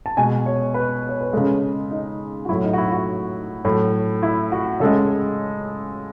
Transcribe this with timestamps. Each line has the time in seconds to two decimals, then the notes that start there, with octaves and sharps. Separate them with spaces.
0.06 A5
0.17 B2 G#3 G#5
0.46 C#5
0.74 B4
1.09 C#5
1.21 B4
1.33 C#3 G#3 A4
1.91 D#4
2.45 F#4
2.49 F#3 E4
2.52 A2
2.64 D#4
2.73 F#4
2.78 E4
2.92 F#4
3.65 A2 F#3
4.23 E4
4.52 F#4
4.80 C#3 G#3 A4